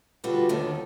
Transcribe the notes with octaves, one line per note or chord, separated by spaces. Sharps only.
D3 G3 F4 F#4 B4
D#2 D3 D#3